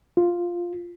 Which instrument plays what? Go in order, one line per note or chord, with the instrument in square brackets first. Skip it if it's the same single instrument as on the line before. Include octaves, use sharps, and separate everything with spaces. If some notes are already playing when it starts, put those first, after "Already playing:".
[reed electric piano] F4